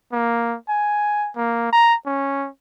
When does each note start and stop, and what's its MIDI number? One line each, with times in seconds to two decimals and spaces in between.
0.12 0.56 58
0.69 1.30 80
1.36 1.68 58
1.73 1.95 82
2.06 2.48 61